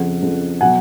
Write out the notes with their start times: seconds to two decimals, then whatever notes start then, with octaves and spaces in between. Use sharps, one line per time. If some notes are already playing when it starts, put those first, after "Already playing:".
Already playing: F2 C#3 F3 F#5
0.22 F2 C#3 F3
0.61 B2 F#3 F#5 G#5